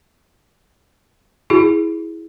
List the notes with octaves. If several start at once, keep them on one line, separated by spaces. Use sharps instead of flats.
E4 F#4 G#4